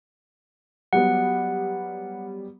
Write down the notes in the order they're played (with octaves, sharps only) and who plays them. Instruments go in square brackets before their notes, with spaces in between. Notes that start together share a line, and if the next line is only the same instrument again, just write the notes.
[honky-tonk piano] F#3 G3 B3 [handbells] F#5